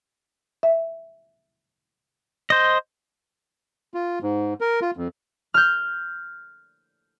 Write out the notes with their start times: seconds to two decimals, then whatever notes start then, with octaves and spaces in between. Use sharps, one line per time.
0.63 E5
2.50 C5 D#5
3.94 F4
4.23 G#2
4.61 A#4
4.82 F4
4.97 F2
5.54 F6 G6